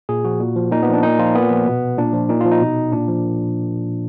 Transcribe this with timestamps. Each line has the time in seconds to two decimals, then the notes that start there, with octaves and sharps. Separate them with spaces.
0.09 A#2 G#4
0.25 F3 F#4
0.40 A#2
0.56 F3
0.72 A#2 D#4
0.83 B3
0.88 F3 D4
1.03 A#2 D#4
1.19 F3 F4
1.35 A#2 B3
1.50 F3
1.66 B2
1.98 A#2 D4
2.14 F3
2.29 A#2 D#4
2.41 F3 F4
2.51 D#4
2.61 B2
2.92 A#2 D4
3.08 F3